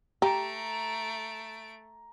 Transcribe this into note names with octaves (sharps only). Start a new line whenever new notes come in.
A3 G4 A#5 D7